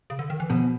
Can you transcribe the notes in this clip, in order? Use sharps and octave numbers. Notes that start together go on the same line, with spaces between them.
C#3
D3
D#3
E3
B2 F3